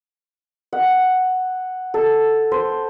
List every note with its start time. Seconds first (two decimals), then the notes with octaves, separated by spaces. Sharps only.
0.73 F#5
1.94 A4
2.52 C5